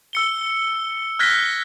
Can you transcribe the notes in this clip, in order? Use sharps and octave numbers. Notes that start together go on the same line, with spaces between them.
E6 C#7 G7
F6 F#6 G#6 A#6 B6 G7